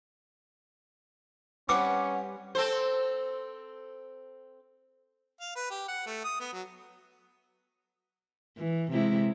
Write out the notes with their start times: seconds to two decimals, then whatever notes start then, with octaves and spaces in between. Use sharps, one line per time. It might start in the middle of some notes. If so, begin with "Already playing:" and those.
1.69 G3 C4 C#4 B4 F#5 D6
2.55 C4 A4 C5
5.40 F5
5.56 B4
5.70 G4
5.88 F#5
6.06 A3
6.24 D#6
6.40 B3
6.53 F#3
8.58 E3
8.92 C3 G#3 E4